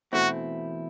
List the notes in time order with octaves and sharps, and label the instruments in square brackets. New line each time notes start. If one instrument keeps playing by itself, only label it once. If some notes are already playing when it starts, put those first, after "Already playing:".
[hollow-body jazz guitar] E2 B2 A3 C4 E4 [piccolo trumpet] F#4